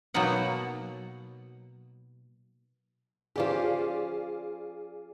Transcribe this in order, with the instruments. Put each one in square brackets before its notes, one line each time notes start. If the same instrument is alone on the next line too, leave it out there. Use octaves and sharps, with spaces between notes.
[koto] B2 F#3 A#3 B3 D#4 F#5
[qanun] F3 C#4 G4 [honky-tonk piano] G#4 D5 F5